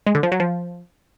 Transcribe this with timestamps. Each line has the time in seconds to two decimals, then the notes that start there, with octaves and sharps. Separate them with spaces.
0.07 G#3
0.15 D3
0.23 F3
0.32 F#3
0.40 F3